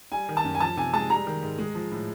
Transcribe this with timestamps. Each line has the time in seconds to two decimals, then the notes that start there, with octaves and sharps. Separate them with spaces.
0.12 G3 G#5
0.29 D#3
0.37 A5
0.44 F#2
0.55 G#5
0.60 F3 A5
0.77 C3 G#5
0.93 G#3 A5
1.10 G3 A#5
1.27 D#3
1.43 G#2
1.59 G#3
1.75 F3
1.92 A2